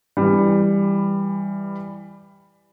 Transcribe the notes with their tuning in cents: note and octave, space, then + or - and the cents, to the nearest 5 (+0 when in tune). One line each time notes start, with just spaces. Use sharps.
E3 +5 G3 +15